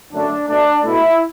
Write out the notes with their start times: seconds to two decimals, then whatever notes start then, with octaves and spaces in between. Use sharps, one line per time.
0.12 F#2 D3 A3 D4
0.48 B2 A3 D4
0.83 B2 A3 E4